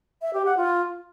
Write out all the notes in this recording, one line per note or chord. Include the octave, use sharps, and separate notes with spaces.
E5
G4
F#5
F4